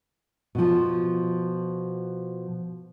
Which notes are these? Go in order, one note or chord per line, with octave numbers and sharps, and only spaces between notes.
B2 F3